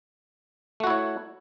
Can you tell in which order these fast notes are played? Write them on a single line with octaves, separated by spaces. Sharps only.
A3 F#4 E4 C#5